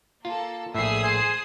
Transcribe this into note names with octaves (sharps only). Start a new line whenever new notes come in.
A#3 F4 A4
A#1 A2 G#4 E5 D#6 C7
C5 G#5